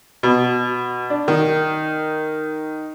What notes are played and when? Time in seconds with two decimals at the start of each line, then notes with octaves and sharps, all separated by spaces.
0.23 B2
1.10 D4
1.28 D#3